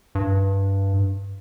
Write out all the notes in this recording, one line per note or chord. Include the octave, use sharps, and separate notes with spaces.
G2